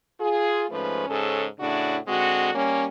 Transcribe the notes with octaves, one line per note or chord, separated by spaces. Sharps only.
F4 G#4
G#2 F3 A3 C#4 B4
G#2 C#3 C#4 A4
A2 C#3 D4 E4 F#4
D3 G#3 C4 F#4
G3 A#3 C#4